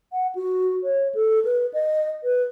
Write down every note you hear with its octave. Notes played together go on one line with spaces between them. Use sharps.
F#5
F#4
C#5
A4
B4
D#5
B4